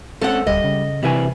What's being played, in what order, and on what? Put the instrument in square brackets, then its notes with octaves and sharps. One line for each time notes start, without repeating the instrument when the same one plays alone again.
[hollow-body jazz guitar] G#3 C4 C#4 [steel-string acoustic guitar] A4 F#5
[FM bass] D1 [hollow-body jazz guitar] G3 [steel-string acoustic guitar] D#5
[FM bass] C#3
[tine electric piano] C3 E3 [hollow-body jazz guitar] G3 E5 G#5